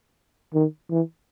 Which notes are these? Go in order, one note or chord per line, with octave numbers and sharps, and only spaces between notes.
D#3
E3